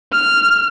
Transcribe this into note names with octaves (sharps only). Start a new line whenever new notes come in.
F6